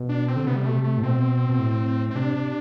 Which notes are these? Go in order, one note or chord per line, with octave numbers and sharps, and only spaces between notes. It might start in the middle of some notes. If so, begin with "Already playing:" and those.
Already playing: B2
D4
C4
D3
C3 B3
G3
B2 A3
C3
A3
A2
B2 C4
B2
A2
C4
C3 D4
C3